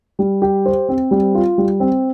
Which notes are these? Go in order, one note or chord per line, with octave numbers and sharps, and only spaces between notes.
G3
G4
C5
C4
G3
F4
G3
C4